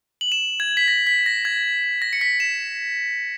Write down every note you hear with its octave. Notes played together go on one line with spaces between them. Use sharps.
F#7
E7
G#6
B6
A#6
B6
A#6
G#6
A#6
C#7
B6
E7